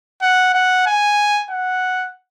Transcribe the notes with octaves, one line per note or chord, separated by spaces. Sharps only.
F#5
F#5
G#5
F#5